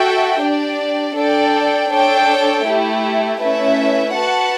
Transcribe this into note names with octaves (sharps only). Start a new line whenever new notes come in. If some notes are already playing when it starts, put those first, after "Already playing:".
Already playing: F#4 A4 E5 G5
D4 G4 D5
D4 A4 D5 G5
D4 A4 C#5 G5
A3 E4 G4
A3 C#4 E4 B4 E5
F#4 B4 F#5 A5